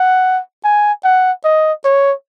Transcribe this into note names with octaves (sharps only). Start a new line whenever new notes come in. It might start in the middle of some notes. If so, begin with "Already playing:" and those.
Already playing: F#5
G#5
F#5
D#5
C#5